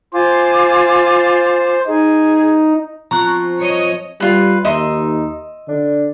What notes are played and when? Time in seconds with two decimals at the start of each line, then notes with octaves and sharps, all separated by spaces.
0.13 F4 C5 G#5 D6
1.87 D#4 G#4
3.11 F3 C4 A#5 C#6 F#6
3.58 C#5 D#5
4.20 G3 F4 B4
4.65 D#2 D#4 D#5 E5 C6
5.69 D3 D4